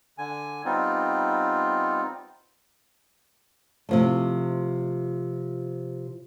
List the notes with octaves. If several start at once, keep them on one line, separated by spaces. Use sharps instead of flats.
D3 G#5
G3 B3 C4 D#4 F4
C3 F3 A3